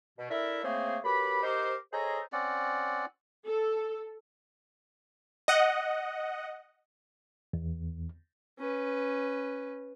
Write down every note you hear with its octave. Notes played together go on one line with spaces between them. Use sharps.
B2
D4 E4 A4 A#4 E5
C#3 A3 A#3 C4 G#4 C5
F#2 G4 B4 B5
D#4 G4 A#4 C5
G#4 A4 C5 C#5 D#5 A#5
C4 C#4 D5 F#5
A4
D#5 F#5
E2
C#4 B4